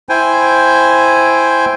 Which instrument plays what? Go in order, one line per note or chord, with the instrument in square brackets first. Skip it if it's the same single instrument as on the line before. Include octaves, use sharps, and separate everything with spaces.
[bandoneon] E4 C5 G5 G#5